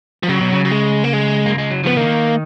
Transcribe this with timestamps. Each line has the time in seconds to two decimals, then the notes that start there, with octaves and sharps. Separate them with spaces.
0.23 F3
0.29 C#3 F#3
0.41 B2
0.52 C#3
0.65 F#3
0.71 G#3
1.04 A#3
1.13 G#3
1.46 A#3
1.58 G#3
1.71 F#3
1.84 F3 B3
1.97 D#3 A#3